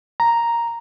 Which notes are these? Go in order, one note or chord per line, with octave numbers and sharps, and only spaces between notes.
A#5